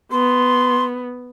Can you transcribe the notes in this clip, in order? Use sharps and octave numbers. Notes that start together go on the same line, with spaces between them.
B3 C6